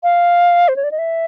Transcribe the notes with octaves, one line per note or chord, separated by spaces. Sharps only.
F5
C5
C#5
D5
D#5
E5